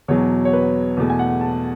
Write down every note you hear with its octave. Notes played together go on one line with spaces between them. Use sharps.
E2 B2 F#3 C#5
C#5
B4
E2 B2 A3
G#5
F#5
A5